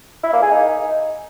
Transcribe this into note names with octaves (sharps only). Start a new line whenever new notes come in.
E4
A#3
G#4
D#4